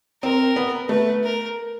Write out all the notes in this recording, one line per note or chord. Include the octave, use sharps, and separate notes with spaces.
C4 A#4
B3
A3 B4
A#4